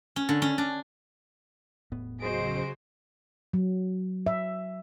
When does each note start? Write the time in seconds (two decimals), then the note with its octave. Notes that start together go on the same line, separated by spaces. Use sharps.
0.16 C#4
0.29 D3
0.42 C#4
0.58 D4
1.92 E1 A2 B3
2.20 C#3 F#3 F#4 G#4 C5 D#5 D7
3.54 F#3
4.27 E5